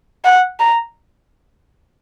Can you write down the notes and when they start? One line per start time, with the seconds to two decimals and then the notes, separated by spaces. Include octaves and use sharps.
0.25 F#5
0.60 A#5